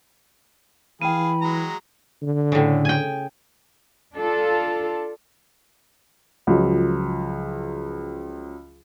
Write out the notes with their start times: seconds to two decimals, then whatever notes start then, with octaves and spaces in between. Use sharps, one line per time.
1.02 E3 G#4 F5 G5 B5 D#7
1.41 F#3 G#3 A#5
2.22 D3
2.52 A2 C#3
2.85 G5 G#5
4.15 D4 F4 A4
6.47 C#2 F3 F#3